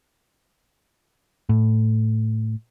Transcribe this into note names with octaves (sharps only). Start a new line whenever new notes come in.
A2